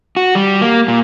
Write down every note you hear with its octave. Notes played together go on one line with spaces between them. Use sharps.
F#4
G3
A#3
A#2